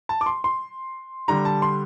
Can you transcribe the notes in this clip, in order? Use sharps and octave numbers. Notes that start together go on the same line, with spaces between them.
A5
D6
C6
C6
D3 G3 D4 A#5
A5
C6